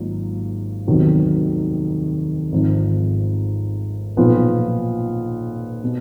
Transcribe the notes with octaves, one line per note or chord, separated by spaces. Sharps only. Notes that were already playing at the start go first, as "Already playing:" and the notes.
Already playing: G#1 G#2 F#3 A#3 F4
F1 D#2 D#3 F#3 B3
G#1 G#2 F3
B1 A#2 F3 B3 F4
B2